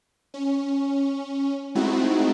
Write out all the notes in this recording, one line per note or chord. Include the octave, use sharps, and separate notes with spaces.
C#4
G#3 A3 C4 D#4 E4 F#4